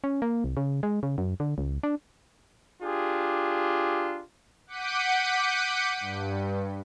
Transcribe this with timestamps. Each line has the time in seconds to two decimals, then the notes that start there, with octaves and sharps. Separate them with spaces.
0.04 C#4
0.22 A#3
0.44 C2
0.57 C#3
0.83 G#3
1.03 C#3
1.18 F#2
1.40 D3
1.58 C#2
1.83 D4
2.83 D4 F4 G4 G#4
4.67 F#5 D6 G6 B6 C#7 D#7
6.00 G2